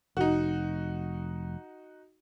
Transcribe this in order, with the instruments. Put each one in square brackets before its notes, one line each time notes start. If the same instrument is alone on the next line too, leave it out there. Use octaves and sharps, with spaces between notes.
[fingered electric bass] F1 [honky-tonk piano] D#4 F#4